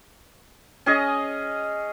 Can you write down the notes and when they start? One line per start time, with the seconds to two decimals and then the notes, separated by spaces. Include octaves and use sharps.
0.86 C#4 G#4 D#5